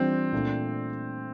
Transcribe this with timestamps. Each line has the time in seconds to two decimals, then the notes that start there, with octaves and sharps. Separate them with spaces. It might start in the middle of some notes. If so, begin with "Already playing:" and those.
Already playing: E3 G3 C4 D4 F4
0.32 A#2 A3 D4